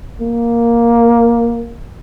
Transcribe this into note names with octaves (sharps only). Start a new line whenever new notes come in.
A#3